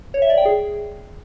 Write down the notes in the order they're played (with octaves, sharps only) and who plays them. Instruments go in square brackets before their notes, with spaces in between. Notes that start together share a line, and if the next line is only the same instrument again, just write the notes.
[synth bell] C#5
E5
D5
G5
G#4